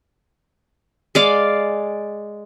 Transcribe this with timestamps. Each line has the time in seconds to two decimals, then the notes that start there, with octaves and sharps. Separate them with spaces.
1.15 G#3 D5 F5